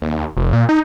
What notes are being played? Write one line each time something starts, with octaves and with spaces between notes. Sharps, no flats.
D#2
F1
A#2
D#4